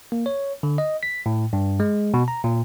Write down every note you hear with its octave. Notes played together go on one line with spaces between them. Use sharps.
A#3
C#5
D3
D#5
B6
A2
G2
G#3
B2
A#5
A#2